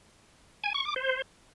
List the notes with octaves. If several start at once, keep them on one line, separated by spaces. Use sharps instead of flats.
G#5
C#6
D6
C5